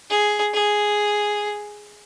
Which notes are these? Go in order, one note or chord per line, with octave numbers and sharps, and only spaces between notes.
G#4
G#4